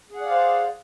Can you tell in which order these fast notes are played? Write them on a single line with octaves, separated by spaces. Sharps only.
G#4 F#5 D5 F5 C5